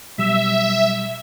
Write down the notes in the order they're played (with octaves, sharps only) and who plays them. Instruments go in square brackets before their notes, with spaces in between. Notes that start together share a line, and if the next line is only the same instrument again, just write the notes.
[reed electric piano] B2 F#3 G3 [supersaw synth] E5